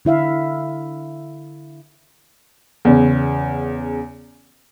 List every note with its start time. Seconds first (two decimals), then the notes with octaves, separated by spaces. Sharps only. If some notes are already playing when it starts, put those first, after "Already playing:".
0.05 D3 E4 E5 F5
2.85 E2 C#3